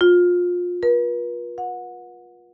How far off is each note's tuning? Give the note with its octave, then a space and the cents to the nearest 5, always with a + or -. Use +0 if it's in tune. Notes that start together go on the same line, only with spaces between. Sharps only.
F4 +25
B4 -40
F#5 -25